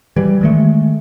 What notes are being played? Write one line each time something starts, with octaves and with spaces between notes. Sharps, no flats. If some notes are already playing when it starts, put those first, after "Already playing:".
E3 G3
D#3 G#3 A3